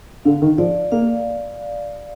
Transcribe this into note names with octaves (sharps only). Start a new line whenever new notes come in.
D3 F5
D#3
F3 D5
A#3 F5